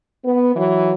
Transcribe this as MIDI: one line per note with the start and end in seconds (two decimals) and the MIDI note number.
0.24 0.55 59
0.55 0.94 52
0.55 0.94 54